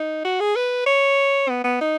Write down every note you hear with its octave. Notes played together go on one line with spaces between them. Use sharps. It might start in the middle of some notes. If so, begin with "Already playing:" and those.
Already playing: D#4
F#4
G#4
B4
C#5
B3
B3
D#4